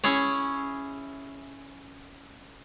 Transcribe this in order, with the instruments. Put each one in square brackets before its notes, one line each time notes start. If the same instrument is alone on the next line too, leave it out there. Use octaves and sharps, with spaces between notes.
[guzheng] C#4 E4 G#4 C#5